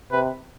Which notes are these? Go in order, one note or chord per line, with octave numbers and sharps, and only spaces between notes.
C3 B4